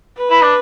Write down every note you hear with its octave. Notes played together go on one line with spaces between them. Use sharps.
B4
E4
D4